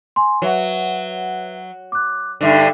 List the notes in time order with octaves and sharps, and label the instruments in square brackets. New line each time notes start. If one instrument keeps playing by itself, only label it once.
[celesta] G#5 C6
[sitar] F#3 [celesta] B4 E5 F#5
[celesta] D6 F#6
[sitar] G2 D3 [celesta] D#4 E5